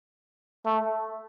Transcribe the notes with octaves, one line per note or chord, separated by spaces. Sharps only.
A3